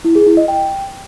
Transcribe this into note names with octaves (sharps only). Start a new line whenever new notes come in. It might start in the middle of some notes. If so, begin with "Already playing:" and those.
E4
G#4
E4
D#5
G5